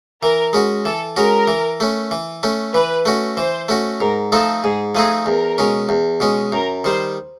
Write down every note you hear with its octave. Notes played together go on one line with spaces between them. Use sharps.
E3 A#4
G#3 C#4 F#4
E3 A4
G#3 C#4 F#4 A#4
E3
A3 C#4
E3
A3 C#4
E3 B4
A3 C#4 F#4
E3 C5
A3 C#4 F#4
G#2 A#4
F3 A3 C4 D#4 A4
G#2 G#4
F3 A3 C4 D#4 G#4
E2 A#4
B2 G#3 C#4
E2
B2 G#3 C#4
F#2 A#4
D#3 G3 C5